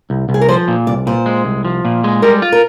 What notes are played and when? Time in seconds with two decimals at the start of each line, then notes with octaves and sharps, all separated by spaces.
0.10 C2
0.29 C2
0.34 G#4
0.41 A#4
0.49 F3 C5
0.68 A#2
0.87 C2 D5
1.07 A#2 C5
1.26 G#3
1.45 C2
1.65 F3
1.85 A#2
2.04 G#3
2.22 G3 A#4
2.42 F4
2.52 A#4